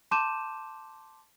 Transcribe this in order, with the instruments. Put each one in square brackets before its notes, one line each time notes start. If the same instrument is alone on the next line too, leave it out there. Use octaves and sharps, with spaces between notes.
[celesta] A5 C6 D6 G6 D#7 E7